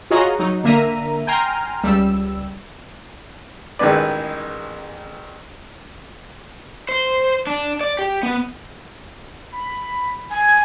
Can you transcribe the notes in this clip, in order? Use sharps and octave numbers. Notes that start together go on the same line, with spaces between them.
F4 F#4 G#4 C#5 D#5 A#5
F#3 D#4
D3 A#3 E5 A#5 D#7
G5 G#5 A#5 C6 F6
C#2 G3 E6
A1 D#3 E3 G#3 B4 D5
C5
D4
D5
G4
B3
B5
G#5 G#6